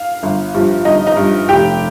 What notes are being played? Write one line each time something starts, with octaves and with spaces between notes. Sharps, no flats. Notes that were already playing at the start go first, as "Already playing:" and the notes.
Already playing: F5
G1
G2 F3
G1 D#4 D#5
D#4 D#5
G2 F3
F1 G4 G5